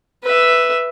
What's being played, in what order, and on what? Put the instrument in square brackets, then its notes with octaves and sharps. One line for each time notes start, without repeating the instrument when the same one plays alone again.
[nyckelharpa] B4 E5